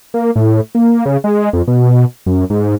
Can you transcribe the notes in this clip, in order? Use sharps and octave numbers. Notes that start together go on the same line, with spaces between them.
A#3
A2
A#3
C#3
G#3
F2
B2
F#2
G#2